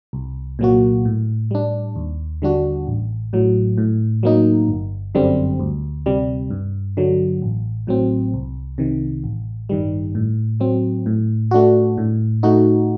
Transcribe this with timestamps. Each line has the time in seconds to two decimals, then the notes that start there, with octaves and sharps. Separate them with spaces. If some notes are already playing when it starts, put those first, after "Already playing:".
0.13 C2
0.59 A#2 F#3 A#3 F#4
1.05 A2
1.51 G3 D4
1.96 D#2
2.42 D3 G3 D4 F#4
2.87 A1
3.33 A2 F#3
3.78 A2
4.23 F#3 A#3 D#4
4.68 G1
5.15 F#2 D3 G3 C4
5.59 D2
6.06 C3 G3
6.50 G2
6.97 D3 F#3
7.42 A1
7.87 A2 F#3 C4
8.34 C2
8.78 C3 D#3
9.24 A1
9.69 G2 D#3 G3
10.15 A2
10.60 F#3 C4
11.06 A2
11.51 A3 D4 F#4
11.98 A2
12.43 A3 D#4 F#4